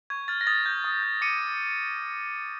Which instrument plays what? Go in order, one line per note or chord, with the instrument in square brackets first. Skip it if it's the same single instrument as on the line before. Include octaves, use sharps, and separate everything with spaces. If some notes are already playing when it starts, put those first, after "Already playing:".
[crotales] C#6 G#6
F6 A6
A#6
D#6 A6
G6
D#6
G6
D6 C#7 D#7